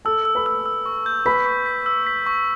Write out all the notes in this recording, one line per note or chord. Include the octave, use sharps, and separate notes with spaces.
A4 A5 E6
E6
B4 B5
E6
E6
C#6
G6
B4 B5 B6
C#6
B6
E6
B6
C#6